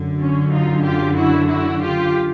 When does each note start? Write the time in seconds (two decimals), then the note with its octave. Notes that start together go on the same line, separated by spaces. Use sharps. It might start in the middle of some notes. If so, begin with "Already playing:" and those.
Already playing: F#2 D3
0.19 C#4
0.51 D#4 F4
0.84 F4 G4
1.15 E4 F#4
1.48 E4 F#4
1.80 F4 G4